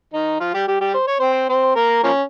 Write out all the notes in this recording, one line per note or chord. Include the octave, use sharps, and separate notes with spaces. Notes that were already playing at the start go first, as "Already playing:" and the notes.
D#3 D#4
F3 F4
G3 G4
G3 G4
G3 G4
C5
C#5
C4 C5
C4 C5
A#3 A#4
F3 A#3 C#4